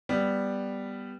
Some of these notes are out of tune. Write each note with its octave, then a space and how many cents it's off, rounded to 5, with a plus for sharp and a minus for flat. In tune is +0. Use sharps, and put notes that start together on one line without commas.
G3 +0 B3 +0